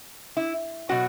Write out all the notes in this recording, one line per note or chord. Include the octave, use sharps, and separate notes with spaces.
E4
B2 F#3 F#4